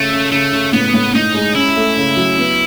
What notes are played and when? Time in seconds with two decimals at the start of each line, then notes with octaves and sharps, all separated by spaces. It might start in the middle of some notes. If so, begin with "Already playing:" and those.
Already playing: C#3 A3
0.11 C#3
0.32 C#3 A3
0.52 C#3
0.73 A2 B3
0.94 A2
1.14 A2 D#4
1.35 G#3
1.55 C#4 E4
1.76 A3
1.97 C#3
2.17 F#3
2.38 B3